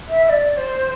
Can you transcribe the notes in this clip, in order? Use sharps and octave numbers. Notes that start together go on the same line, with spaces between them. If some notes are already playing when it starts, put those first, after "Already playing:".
E5
E5
D5
C5